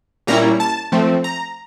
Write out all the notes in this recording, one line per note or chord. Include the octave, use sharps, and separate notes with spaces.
A#2 G3 A#3 C#4 E4 A#5
A5
F3 A3 C4
A#5